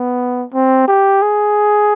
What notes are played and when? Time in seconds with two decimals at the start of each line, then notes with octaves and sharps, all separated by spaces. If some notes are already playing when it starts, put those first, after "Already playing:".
Already playing: B3
0.53 C4
0.88 G4
1.22 G#4